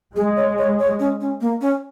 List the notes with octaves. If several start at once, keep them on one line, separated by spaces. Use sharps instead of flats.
G#3 G#4
C#5
C#5
C#5
C#4
C#4
A#3
C#4